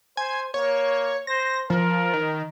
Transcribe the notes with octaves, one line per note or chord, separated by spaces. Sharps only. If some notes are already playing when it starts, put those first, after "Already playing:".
C5 G#5
A#3 C#5
C5 A#6
F3 A#4
D#3